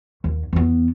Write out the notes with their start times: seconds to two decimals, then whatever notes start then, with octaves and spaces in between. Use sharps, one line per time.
0.24 D#2
0.53 E2 B3